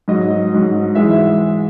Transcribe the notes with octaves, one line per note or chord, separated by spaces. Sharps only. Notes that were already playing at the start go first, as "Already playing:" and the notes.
G#2 F#3 D#5
G#2 F#3
G#2 E3 G#3 E5